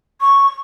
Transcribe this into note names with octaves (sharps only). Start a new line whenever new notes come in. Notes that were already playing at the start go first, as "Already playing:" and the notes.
C#6